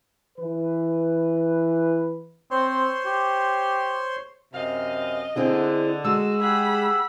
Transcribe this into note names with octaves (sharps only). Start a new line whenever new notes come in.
E3 B4
C4 C5 C#5 C6
G4
F#2 C3 D#5 F5
D3 C4 E4 G#4
G#3 F#4 E6
G4 G#4 F#5 B5